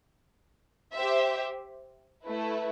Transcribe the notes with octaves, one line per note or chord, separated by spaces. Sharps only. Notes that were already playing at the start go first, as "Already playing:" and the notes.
G4 C5 E5
A3 E4 B4